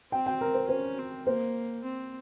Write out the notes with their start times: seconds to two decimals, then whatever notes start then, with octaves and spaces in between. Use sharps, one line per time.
0.12 C4 G5
0.26 G5
0.41 A#4
0.54 C5
0.69 C#4 C5
0.98 C4
1.27 A#3 C5
1.84 C4